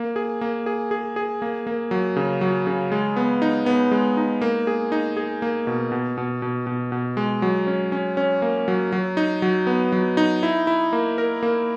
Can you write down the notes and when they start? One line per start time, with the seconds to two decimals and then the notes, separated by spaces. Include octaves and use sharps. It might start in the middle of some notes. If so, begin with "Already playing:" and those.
Already playing: A#3
0.16 G#4
0.41 A#3
0.66 G#4
0.91 G#4
1.16 G#4
1.42 A#3
1.67 A#3
1.91 F#3
2.16 C#3
2.41 F#3
2.67 C#3
2.92 G#3
3.16 B3
3.42 D#4
3.66 B3
3.91 G#3
4.17 D#4
4.41 A#3
4.67 G#4
4.92 D#4
5.17 G#4
5.42 A#3
5.67 B2
5.92 B2
6.17 B2
6.42 B2
6.67 B2
6.92 B2
7.17 G#3
7.42 F#3
7.67 C#4
7.92 C#4
8.17 C#4
8.42 A#3
8.68 F#3
8.92 F#3
9.17 D#4
9.42 F#3
9.67 B3
9.92 F#3
10.17 D#4
10.43 E4
10.67 E4
10.93 A#3
11.18 A#4
11.43 A#3